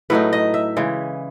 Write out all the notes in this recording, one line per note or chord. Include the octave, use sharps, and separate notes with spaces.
A2 F#3 A3 D#4 B4
D#5
E5
C#3 E3 G#3